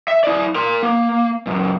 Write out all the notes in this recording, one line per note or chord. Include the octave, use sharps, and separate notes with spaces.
E5
E4 D5
A#4 C6
A#3
C#2 F#2